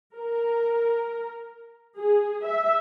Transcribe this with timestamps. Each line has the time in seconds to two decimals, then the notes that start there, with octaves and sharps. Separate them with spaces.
0.15 A#4
1.98 G#4
2.45 E5